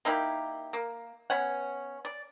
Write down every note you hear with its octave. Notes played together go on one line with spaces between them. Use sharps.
A#3 D#4 E4 G4
A#3
B3 C#4 F#5
D5